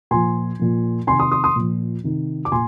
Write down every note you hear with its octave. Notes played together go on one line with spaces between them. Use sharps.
A#2 F3 G#5 C6
A#2 F3
C3 D#3 G#5 C6
C6 D#6
C6 D#6
C6 D#6
A#2 F3
C3 D#3
D6
A#2 G#5 C6